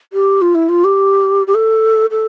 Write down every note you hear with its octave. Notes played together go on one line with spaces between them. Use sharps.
G4
F4
E4
F4
G4
G4
A4
A4